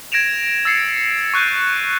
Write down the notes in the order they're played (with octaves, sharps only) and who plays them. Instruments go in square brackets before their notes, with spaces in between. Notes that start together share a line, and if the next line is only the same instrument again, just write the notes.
[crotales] G#6 A#6 D7 E7 F7
E6 A6 A#6 C7 C#7
C#6 F#6 G6 D#7